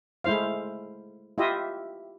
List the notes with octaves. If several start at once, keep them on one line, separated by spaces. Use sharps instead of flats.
G#3 A3 E4 C5 F5
E4 F4 G4 D#5 E5